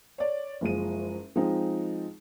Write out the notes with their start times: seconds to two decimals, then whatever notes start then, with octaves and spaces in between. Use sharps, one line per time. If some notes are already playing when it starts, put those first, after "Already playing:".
0.18 C#5 D5
0.61 F#1 F3 G#3 D#7
1.36 F3 G#3 C4 D#4